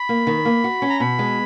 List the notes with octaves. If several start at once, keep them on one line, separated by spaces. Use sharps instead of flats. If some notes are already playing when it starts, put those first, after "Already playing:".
Already playing: B5
A#3
D#3
A#3
F#4
C#4
A#5
B2 B5
G#3